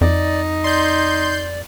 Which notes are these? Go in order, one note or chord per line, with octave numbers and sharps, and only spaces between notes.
F2 D#4 D5
D5 C6 G6